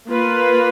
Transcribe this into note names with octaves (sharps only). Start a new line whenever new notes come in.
A#3 F4 B4